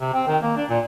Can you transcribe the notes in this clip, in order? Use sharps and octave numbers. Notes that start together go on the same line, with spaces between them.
C3
C4
D#3
A#3
D4
A#2